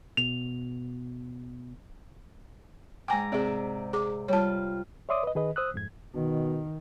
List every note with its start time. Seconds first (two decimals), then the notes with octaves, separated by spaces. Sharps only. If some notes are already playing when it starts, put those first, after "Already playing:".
0.17 B2 F7
3.08 G#2 G5 G#5 A#5 D6
3.32 C3 C4 G#4 D5 E5
3.93 G#4 D6
4.28 G3 F4 C#5 A5
5.09 C#5 D5 E5 C6 D6 D#6
5.23 B4 D#5
5.35 D#3 G#4 B4 D#5
5.56 C5 D#6 E6 F#6
5.74 F2 G#2 G#6
6.15 B2 D#3